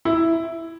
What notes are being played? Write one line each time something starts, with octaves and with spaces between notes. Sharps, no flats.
E4